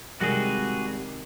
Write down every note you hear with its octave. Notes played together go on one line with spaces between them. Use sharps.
C3 D#3 G3 G#3 F#4 G#4 D5